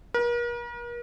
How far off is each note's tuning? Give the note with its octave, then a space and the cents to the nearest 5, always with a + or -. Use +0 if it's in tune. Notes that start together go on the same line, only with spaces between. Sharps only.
A#4 +40